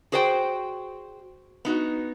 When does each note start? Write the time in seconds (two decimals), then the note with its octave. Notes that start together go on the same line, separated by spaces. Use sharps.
0.12 F#4 G#4 C5 D5 G5
1.65 B3 D#4 F#4